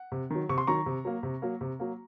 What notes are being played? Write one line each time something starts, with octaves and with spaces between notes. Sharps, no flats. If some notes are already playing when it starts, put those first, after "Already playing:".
Already playing: F#5
C3
D#3 F#3
C3 C#6
C6
D#3 F#3 A#5 C#6
C3
F#3 A#3
C3
F#3 A#3
C3
F#3 A#3